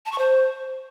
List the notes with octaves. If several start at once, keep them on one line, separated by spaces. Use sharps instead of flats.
A5
C#6
C5